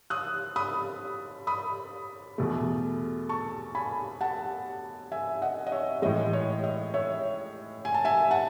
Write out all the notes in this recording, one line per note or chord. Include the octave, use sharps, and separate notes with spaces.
D#6 F#6
B5 D#6
B5 D#6
E2 B2 A3
A5 C#6
G#5 B5
F#5 A5
E5 G#5
D#5 F#5
D#5
C#5 E5
A2 E3 G#3 D#5
C#5
D#5
C#5 E5
G#5
A5
E5 G#5
F#5 A5